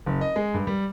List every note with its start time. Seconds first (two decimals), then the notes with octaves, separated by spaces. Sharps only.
0.06 F#1
0.21 D#5
0.36 G#3
0.54 G2
0.67 G3